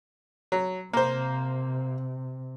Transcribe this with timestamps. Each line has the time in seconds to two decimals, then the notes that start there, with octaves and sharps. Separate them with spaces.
0.52 F#3
0.93 C3 A#3 C5